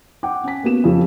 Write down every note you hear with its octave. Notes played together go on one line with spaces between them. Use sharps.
F#5 G5 D6
C#4 B6
A#3 B3 F#4 E7
F2 C#3 F3 G4